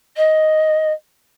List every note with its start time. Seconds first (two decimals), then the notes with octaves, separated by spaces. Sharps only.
0.16 D#5